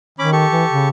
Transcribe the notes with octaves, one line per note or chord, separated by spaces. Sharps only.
D#3 C#4 B5 D6
G4 A4 C#6
E3
C#3